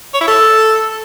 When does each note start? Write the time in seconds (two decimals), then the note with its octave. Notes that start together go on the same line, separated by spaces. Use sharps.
0.14 C#5
0.21 E4
0.28 A4